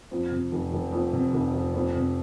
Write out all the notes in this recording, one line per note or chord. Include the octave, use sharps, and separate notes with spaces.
F2
C3
F1
F1
F2
C3
F1
F1
F2
C3